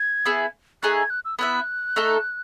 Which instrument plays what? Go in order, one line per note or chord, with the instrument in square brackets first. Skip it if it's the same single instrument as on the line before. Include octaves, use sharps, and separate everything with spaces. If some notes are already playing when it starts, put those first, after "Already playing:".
Already playing: [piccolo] G#6
[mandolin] B3 E4 G#4
[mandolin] A3 D#4 G#4 D#5 [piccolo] F#6
[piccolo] G#6
F#6
E6
[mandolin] B3 E4 B4 E5 [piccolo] F#6
[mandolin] A3 D#4 A4